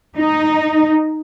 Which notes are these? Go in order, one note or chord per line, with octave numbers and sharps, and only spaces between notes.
D#4